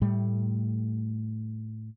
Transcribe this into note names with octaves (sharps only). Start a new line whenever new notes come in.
A2 G3 A3